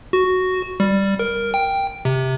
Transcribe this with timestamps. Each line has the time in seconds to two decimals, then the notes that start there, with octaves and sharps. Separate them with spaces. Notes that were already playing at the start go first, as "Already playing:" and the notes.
0.13 F#4
0.80 G3
1.19 A#4
1.54 G5
2.05 C3